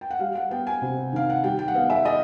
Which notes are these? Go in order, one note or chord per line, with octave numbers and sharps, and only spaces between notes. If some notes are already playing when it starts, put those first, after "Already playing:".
G5
F#5
G3 F5
F#5
B3 G5
G#5
C3
D#3 F5
F#5
G3 G5
G5
F#5
B3 F5
E5
D#5